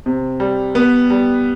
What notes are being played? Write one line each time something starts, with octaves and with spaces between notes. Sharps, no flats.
C3
G3
B3
G3